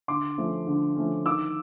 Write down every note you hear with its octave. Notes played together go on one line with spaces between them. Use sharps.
D3 C6 D6
F3 A3 C#4
D3
F3 A3 C#4
D#3 D6 E6